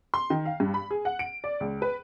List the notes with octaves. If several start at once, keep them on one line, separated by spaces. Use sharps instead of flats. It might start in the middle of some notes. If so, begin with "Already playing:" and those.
C6
D#3
F5
G2
B5
G#4
F#5
D7
D5
C#2
B4